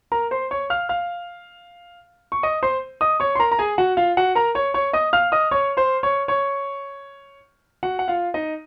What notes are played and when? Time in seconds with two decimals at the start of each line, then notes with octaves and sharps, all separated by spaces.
0.12 A#4 A#5
0.31 C5 C6
0.51 C#5 C#6
0.70 F5 F6
0.89 F5 F6
2.32 C#6
2.43 D#5 D#6
2.63 C5 C6
3.01 D#5 D#6
3.20 C#5 C#6
3.35 C6
3.39 A#4 A#5
3.52 A#5
3.59 G#4 G#5
3.78 F#4 F#5
3.97 F4 F5
4.17 F#4 F#5
4.35 A#4 A#5
4.55 C#5 C#6
4.74 C#5 C#6
4.93 D#5 D#6
5.13 F5 F6
5.32 D#5 D#6
5.51 C#5 C#6
5.77 C5 C6
6.03 C#5 C#6
6.28 C#5 C#6
7.83 F#4 F#5
7.99 F#5
8.08 F4 F5
8.34 D#4 D#5